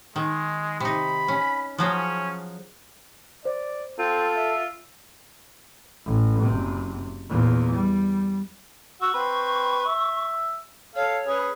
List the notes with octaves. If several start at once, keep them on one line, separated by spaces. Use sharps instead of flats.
D#3 G#3
C3 D#4 B5
C#4
F3 F#3 C#4 G#4
C5 D5
C4 F4 A4
E5
A1
F#1 C3
E2 A#2
G3
F#4 C#6 E6
C4 B4
E5
A4 C#5 F5
C#4 G#4 B4